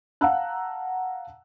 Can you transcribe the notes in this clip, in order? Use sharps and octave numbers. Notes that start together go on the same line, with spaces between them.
F5 F#5 A5 A#5 E6 F#6